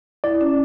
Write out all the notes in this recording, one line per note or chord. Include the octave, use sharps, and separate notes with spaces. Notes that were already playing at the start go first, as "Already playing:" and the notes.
E4 D5
C#4